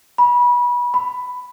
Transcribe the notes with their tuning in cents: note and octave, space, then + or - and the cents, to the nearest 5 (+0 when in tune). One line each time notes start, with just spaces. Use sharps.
B5 -25
B5 +10